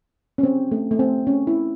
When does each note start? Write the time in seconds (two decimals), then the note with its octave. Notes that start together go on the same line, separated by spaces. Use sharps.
0.38 C#4
0.43 C4
0.72 A3
0.91 A3
0.99 C4
1.27 C#4
1.47 E4